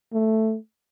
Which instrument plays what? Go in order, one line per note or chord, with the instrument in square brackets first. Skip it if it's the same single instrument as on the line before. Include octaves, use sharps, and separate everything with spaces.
[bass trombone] A3